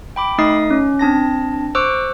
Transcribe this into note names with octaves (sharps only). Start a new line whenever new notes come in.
G5 B5 D6
A3 D#4 D#5 D#6 C7
C#4
C4 D4 A5 A#6
C5 C#6 D6 E6 F#6